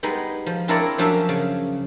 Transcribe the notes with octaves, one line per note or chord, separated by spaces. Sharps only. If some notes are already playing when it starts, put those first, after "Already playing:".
G3 G#3 B3 D#4
F3
C4 D4 E4 A#4 C#5 D5
F#2 F3 C#4 D4 E5 F5
C#3